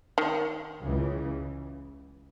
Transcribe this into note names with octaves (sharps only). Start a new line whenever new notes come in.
D#3
C#2 C#3 E3